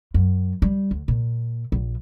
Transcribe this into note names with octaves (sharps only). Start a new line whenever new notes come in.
F#2
G3
D2
A#2
A#1